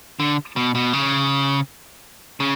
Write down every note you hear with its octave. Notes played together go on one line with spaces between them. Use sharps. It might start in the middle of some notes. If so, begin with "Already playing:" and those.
D3
B2
B2
C#3
C#3